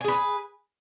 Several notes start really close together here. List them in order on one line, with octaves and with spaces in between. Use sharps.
G#5 G#4 B4